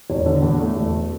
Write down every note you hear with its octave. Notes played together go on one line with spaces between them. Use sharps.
E1 C#5
D3
E2
A3
E1